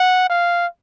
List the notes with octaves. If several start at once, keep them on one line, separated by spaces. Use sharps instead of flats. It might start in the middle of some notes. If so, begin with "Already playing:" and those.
Already playing: F#5
F5